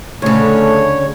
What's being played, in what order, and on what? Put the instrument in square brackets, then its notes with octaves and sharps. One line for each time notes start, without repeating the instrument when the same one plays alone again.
[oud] D2 C#3 [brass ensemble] A3 C#4 D4 [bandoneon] C#5